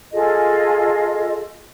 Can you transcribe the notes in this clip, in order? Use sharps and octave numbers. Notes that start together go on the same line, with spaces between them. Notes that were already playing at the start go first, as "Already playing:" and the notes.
F4 G#4 A4 D#5